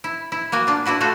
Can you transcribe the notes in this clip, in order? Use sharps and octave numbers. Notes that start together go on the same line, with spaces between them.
E4
E4
A#3 F#4 G#5
D4 F4
D4 E4 F#4 B4
A3 F4 F#4 A4